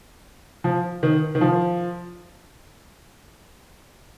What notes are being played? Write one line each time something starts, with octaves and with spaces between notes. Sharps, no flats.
F3
D#3
D#3
F3